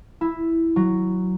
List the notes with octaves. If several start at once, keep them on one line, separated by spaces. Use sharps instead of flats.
E4
F#3